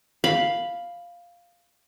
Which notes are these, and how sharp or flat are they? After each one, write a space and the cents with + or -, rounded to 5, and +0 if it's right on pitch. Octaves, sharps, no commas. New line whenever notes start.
F5 +0 B5 +0